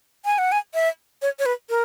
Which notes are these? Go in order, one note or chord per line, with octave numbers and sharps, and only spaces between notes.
G#5
F#5
G#5
E5
C#5
C#5
B4
A#4